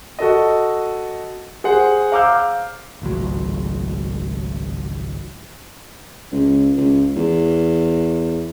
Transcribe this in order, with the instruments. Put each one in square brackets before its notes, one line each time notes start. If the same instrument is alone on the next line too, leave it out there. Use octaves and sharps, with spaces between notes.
[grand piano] F#4 A4 D#5
G#4 C5 F#5
F5 A#5 D6 E6 F6 G6
[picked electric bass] G#1 C#2 A2 F#3
[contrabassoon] C#2
C#2
E2